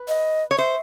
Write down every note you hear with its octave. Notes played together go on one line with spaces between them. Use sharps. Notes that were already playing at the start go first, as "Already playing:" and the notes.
Already playing: B4
D#5
C#5
C5 E5